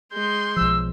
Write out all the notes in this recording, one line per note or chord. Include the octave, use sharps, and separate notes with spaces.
G#3 C6 G6
B1 F3 E6